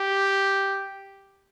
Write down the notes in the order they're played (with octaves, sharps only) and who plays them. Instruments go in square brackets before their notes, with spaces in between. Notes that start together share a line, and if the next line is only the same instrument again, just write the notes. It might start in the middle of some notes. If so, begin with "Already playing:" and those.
Already playing: [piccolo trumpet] G4